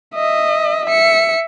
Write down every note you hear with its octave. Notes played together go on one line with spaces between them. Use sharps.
D#5 E5
E5 C#7